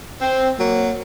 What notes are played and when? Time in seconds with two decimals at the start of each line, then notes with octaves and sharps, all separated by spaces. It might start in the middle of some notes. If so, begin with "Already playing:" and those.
0.20 C4
0.58 F#3 A#3